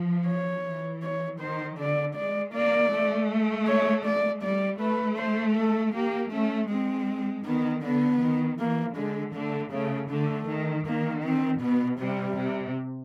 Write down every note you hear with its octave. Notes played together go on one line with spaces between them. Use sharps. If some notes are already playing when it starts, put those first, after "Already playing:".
Already playing: F3
C#5
E3
C#5
D#3 C5
D3 D5
G#3 D5
A#3 D5
A3
C#5
D5
G3 D5
A3 B4
C5
A4
A#3 G4
A3 C#4
G#3 C4
D#3 B3
D3 B3
D#3
E3 A#3
D3 G#3
D3 A3
C#3 A3
D3 A3
D#3
D#3 A#3
C4
B2 B3
C3 G3
C3